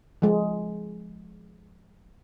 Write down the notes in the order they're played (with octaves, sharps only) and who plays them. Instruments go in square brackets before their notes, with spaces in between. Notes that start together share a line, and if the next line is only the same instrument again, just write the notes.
[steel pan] F3 G#3